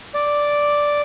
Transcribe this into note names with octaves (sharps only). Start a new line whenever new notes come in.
D5